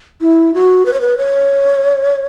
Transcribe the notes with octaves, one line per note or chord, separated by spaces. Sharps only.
E4
F#4
B4
C#5
B4
C#5